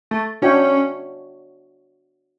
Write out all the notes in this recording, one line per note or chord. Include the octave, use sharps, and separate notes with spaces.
A3
C#4 D4 F#4 C#5 E5 G5